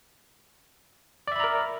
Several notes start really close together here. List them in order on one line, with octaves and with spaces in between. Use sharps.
D5 E5 B5 A#5 A#4